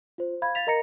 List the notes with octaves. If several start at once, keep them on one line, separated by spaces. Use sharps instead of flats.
F4 C5
F5 B5 G#6
F5 A6 B6 F7
A#4 D#5 A#5 A#6 C#7